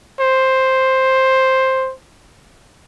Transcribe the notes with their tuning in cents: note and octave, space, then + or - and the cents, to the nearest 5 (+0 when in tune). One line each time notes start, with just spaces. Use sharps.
C5 +5